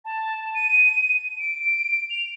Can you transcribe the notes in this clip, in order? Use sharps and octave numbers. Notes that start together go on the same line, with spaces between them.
A5
D#7
D7
F7